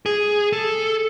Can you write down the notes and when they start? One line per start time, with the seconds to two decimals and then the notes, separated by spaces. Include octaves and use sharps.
0.06 G#4
0.53 A4